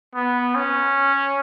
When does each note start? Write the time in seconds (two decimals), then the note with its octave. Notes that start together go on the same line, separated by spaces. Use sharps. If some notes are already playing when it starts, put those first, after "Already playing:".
0.15 B3
0.55 C#4